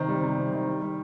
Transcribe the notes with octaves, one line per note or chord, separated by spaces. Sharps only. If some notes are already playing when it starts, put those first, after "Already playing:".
Already playing: C3 D#3 C5
G3
C3
C3
D#3
G3
G3